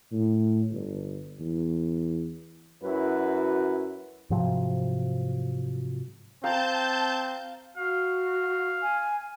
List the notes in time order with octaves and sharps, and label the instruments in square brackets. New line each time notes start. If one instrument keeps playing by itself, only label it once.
[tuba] A2
G1
E2
[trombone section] F#2 E4 F#4 B4
[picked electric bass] G#2 C3 F3 F#3
[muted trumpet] C4 [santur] F5 G5 A#5 [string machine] A5 G6
[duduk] F#4 [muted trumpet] F5
[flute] G#5